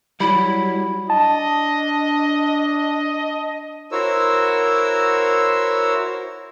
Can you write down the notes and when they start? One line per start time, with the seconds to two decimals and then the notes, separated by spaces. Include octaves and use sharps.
0.20 F#3 G3 E4 B5
1.10 D4 D#5 A5
3.92 E4 F#4 A#4 C5 C#5 E6